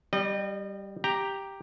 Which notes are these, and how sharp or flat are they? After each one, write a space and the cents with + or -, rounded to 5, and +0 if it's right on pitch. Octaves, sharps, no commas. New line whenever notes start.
G3 -5 D#5 -35
G4 +0 A#5 +0